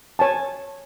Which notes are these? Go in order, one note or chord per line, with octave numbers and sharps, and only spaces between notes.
C#5 G#5 A5